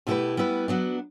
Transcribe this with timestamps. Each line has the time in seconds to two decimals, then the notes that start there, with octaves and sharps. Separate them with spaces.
0.07 B2 A3 E4 G4 B4
0.37 G3 B3 E4 B4
0.68 F#3 B3 D4